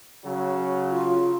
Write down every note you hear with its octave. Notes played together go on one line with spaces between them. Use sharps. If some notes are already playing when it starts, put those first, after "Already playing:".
C#3 F#3
F4